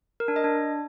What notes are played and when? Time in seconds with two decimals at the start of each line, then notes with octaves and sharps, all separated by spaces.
0.20 A#4
0.28 D4
0.36 D#5
0.44 D4